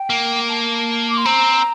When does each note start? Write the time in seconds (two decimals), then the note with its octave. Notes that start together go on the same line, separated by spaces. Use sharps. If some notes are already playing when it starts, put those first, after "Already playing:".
Already playing: G5
0.10 A#3
0.49 A5
1.10 D6
1.17 C6
1.25 C4 A#5